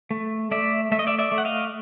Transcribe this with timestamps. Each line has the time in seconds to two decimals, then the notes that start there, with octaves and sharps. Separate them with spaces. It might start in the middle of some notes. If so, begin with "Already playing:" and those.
0.11 A3
0.51 A3 D5 E5
0.92 A3 E5
0.99 D#5
1.07 D5 E5
1.19 D5 E5
1.32 A3
1.38 F#5
1.45 D#5 F5